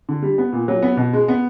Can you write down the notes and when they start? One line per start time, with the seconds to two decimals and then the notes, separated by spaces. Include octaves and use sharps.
0.09 D3
0.22 G3
0.38 B3
0.53 A#2
0.68 F#3
0.82 B3
0.97 B2
1.13 G#3
1.28 B3